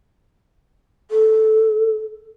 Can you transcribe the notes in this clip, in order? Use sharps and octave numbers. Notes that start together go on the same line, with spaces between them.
A4